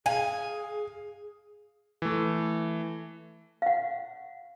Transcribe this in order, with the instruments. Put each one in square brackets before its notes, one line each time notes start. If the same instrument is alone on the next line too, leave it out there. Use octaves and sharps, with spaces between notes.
[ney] G#4 [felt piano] F5 [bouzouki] G#5
[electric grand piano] E3 A3
[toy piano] F5 F#5